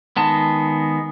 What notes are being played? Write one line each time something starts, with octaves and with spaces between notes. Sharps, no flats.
D#3 G#3 B3 A5